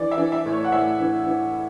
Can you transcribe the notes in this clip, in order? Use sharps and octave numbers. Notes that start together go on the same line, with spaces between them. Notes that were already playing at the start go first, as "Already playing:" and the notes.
Already playing: E3 D5
E5
E3
E5
A2
C#5
F#5
A2 E5
E3
E3